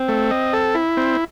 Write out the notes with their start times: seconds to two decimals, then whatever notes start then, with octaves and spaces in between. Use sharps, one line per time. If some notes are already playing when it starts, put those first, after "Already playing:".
Already playing: C4
0.08 A3
0.31 D#5
0.53 A4
0.75 E4
0.97 C4